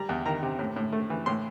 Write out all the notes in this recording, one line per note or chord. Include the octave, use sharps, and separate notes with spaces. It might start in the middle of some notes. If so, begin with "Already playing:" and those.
Already playing: G3 A#5
E2
D#3 A#5
C3
A2
A2
A3
E3
A2 C6